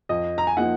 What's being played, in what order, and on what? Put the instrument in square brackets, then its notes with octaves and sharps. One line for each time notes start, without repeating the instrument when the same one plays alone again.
[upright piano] F2 [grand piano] D#5
[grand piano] A#5
G#5
[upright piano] F3 A#3 D#4 [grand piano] F#5